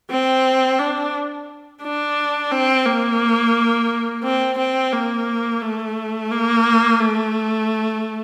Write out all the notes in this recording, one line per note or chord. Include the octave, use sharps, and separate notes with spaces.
C4
D4
D4
C4
A#3
C4
C4
A#3
A3
A#3
A3